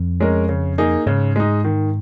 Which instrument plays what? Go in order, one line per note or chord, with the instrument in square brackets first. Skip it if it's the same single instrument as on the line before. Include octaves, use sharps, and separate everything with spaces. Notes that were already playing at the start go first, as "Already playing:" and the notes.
Already playing: [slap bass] F2
[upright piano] G#3 C#4 A#4
C#3
A#3 D#4 G#4
[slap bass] G#2 [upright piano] C#3
[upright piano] G#3 D#4
D#3